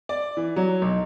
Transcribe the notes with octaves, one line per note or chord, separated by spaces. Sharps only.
D5
E3
F#3
B1